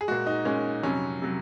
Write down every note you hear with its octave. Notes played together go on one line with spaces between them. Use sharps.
G#4
A#2 G#3 F#4
D#4
A#2 G#3 C#4
F2 C3 F#3 C#4
C3 F#3